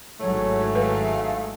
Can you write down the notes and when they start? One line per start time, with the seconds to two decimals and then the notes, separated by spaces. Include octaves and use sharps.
0.20 G#1 G#2 E3 F#3 A3 C#5
0.75 B4 F5